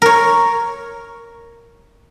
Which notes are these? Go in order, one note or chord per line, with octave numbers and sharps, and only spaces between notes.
A#4 C#5